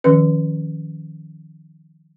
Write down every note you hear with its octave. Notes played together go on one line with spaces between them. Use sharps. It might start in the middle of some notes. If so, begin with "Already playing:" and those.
D#3 F3 C#4 B4